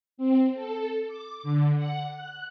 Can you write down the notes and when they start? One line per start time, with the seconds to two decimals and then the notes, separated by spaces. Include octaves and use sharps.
0.17 C4
0.55 A4
1.07 D6
1.43 D3
1.76 F#5
2.15 F#6